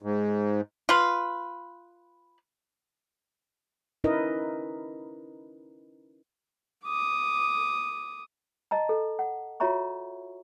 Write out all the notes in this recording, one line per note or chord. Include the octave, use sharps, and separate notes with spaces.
G#2
F4 B4
C#4 D#4 E4 A#4 B4 D#5
D6 D#6
D#5 A5 A#5
A4
F#5
F4 F#4 C#5 E5 A#5 C#6